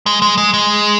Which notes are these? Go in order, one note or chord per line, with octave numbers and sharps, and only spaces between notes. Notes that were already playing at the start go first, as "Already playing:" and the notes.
G#3
G#3
G#3
G#3